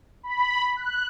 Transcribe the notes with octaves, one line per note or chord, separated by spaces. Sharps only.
B5
F#6